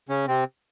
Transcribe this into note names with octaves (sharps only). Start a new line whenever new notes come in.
C#3 C#4
C3 C4